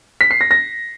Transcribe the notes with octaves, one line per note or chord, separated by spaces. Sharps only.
B6
C7
A#6
A#6